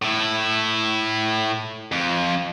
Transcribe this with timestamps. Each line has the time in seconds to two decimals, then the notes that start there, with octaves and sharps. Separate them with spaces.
0.02 A2 E4
1.92 F2